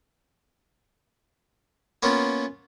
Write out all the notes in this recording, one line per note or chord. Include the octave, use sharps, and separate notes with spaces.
A#3 B3 C#4 F4